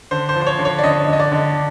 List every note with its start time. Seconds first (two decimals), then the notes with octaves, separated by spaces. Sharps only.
0.11 D3 C5
0.29 C5
0.36 F3
0.41 C5
0.47 C#5
0.59 D3
0.65 C#5
0.79 D5
0.83 D3 D#5
1.08 D3
1.13 D#5
1.20 D5
1.32 D3